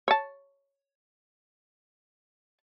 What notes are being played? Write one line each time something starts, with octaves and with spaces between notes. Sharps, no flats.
C#5 A5